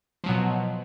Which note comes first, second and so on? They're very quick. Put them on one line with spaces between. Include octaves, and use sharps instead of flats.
F3 F#3 B2